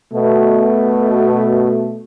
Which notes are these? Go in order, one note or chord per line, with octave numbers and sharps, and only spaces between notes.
B2 A3